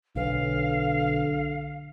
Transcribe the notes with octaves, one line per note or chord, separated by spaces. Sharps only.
B1 D3 F5